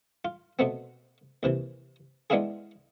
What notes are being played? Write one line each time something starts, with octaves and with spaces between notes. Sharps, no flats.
F4
B2 A3 B3 C4
D#2 C3 E3
G#3 B3 D4 E4 F4 G#4